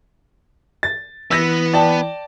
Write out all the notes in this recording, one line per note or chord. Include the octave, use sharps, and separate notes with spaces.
A6
E3 B3 E6 A#6
D5 G5 A5